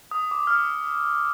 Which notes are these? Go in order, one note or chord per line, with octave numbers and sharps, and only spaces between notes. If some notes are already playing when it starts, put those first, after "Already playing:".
D#6
D6
F6
D#6